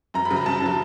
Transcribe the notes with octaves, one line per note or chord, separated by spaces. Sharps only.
F#2 A#5
B5
C#3 F#3
A#5
F#2 A5
C#3 F#3